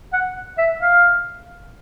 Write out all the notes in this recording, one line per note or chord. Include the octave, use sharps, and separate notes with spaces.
F#5
E5
F5